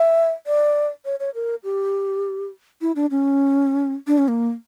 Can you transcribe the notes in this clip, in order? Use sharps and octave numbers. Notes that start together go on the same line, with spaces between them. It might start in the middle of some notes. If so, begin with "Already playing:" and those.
Already playing: E5
D5
C#5
C#5
A#4
G4
E4
D4
C#4
D4
C#4
A#3